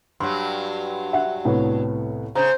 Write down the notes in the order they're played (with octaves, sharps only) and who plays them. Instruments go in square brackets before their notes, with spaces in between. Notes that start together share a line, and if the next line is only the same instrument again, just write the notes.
[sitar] G2 F#3 [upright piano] C6
[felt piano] E5 F#5
[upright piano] C2 B3 C#5 [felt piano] A2
[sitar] C#3 [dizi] C5 [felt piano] A#5